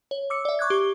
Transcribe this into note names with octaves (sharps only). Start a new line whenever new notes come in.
C#5
D6 E6 C#7
D5 E5
C#6 D6 F#6 G#6
G4 C#6 G7